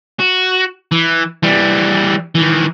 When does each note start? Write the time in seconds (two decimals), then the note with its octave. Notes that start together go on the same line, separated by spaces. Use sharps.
0.19 F#4
0.92 E3
1.43 E3 G3
2.35 D#3 E3